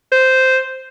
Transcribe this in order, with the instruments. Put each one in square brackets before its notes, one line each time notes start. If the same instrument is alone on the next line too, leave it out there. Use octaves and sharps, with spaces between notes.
[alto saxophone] C5